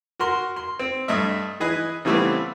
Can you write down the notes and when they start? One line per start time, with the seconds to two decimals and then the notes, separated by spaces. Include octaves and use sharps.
0.20 F#4 A#4 C6
0.56 C6
0.80 C4
1.08 G2 A3 D#5 E5
1.60 E3 G#4 B4 D#5
2.05 C#3 E3 G3 A3 B3 C4